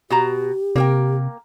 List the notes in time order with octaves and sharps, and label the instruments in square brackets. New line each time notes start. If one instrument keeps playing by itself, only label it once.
[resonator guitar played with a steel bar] B2 F#4 A#5 [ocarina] G4
[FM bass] C3 [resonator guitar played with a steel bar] A#3 A#4 G5